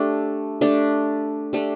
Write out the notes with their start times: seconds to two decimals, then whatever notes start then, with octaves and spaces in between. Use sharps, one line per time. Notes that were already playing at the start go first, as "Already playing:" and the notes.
Already playing: A3 D4 G4
0.61 A3 D4 G4
1.53 A3 D4 G4